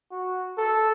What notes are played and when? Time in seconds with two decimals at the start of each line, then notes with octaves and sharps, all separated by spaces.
0.11 F#4
0.58 A4